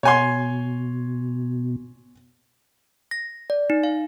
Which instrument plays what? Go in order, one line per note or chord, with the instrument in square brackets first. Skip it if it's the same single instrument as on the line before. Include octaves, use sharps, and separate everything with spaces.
[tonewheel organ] B2 [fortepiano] C#5 G#5 C6
[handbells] A#6
D5
D#4
F5